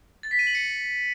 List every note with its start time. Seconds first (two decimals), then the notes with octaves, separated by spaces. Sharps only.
0.23 A6
0.31 B6
0.39 D#7
0.47 F#7
0.55 C#7